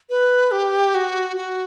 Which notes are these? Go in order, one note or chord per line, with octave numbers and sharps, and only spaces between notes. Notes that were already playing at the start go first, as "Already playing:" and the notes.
B4
G4
F#4
F#4